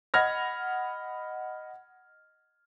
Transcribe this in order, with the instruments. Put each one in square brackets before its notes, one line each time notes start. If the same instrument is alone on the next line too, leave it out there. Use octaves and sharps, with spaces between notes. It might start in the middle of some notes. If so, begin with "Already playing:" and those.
[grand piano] D#5 F#5 B5 F6 G#6 A#6